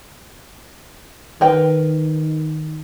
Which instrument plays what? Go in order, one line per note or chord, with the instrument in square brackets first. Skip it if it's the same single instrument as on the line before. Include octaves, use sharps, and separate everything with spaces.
[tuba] D#3 [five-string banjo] A#4 B4 G5